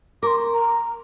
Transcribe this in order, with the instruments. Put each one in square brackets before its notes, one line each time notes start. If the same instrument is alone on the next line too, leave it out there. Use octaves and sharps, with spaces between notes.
[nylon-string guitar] A#4 [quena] D6
[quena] C6
A#5